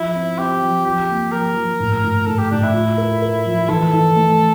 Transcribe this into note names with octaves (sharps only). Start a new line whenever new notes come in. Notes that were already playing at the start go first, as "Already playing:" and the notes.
Already playing: F3 E4
C4
C4 G4
F3
F3 G4
A#3
F3 A#4
F3
A2
A2
A2 A4
G4
A2 D4
E4
F4
A#4
A#4
F3
E3 A4
E3
A3